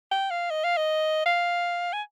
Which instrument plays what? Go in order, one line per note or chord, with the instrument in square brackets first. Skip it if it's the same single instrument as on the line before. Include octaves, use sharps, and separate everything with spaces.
[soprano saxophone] G5
F5
D#5
F5
D#5
F5
G#5